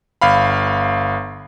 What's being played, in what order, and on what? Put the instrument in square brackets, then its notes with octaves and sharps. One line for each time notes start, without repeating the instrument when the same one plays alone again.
[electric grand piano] G1 F5 B5